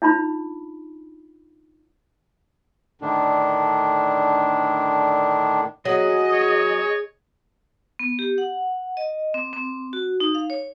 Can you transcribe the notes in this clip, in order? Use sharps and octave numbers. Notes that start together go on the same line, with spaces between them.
D4 D#4 F4 B5
A2 D3 D#3 D4
F#3 G#4 D#5
C#5
B3
G4
F#5
D#5
C4
C4
F#4
D#4
F5
C#5